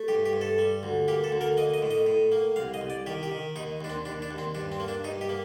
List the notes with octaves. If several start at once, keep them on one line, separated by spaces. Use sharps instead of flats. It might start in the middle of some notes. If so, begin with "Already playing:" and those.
Already playing: A3
G2 G4
G4
G2
A4
G3
D2
A#3 G4
A4
D2
A#4
A#3 D#5
D#5
A2
D#5
A2
A#3
C2 F5
D#5
C2
D5
D#3 G4
G4
D#3
D#2 D#4
D#2 D4
C4
D#2 D4
D4
D#2
C4
G2 D4
C4
A#3
D4
G2 D#4
G4
A#3